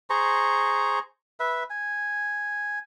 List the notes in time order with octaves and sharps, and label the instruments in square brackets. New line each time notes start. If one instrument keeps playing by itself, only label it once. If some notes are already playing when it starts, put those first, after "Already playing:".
[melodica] G#4 C5 A#5 C#6
B4 E5
G#5